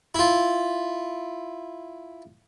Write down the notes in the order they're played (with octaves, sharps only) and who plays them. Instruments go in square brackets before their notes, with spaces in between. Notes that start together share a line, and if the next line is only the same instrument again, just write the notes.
[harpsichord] E4 F4